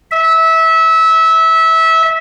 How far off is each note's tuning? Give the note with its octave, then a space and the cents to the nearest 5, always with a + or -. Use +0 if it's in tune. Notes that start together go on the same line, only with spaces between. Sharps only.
E5 -20